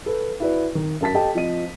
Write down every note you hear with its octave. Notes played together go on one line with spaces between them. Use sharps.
A4 B4
E4 F#4 B4 D5
D#3
F#2 A#4 A5 A6 B6
G4 A4 D#5 G5 A5
F3 C4 D#5 D#7